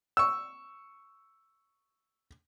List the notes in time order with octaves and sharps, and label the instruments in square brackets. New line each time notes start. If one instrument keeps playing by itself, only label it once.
[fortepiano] C#6 E6